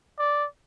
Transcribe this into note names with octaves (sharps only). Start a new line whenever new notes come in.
D5